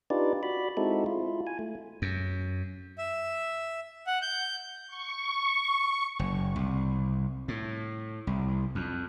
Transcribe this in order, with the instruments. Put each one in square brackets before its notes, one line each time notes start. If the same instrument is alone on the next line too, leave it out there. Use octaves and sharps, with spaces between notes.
[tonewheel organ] D4 D#4 F4 G4 B4 D5
F#4 D5 B5
G#3 C4 D#4 E4 F#4 A4
E4 F4
G#5
A3
[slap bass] F#2
[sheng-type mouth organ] E5
F#5
G6
[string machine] C#6
[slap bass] F#1
C2
A2
C2
F2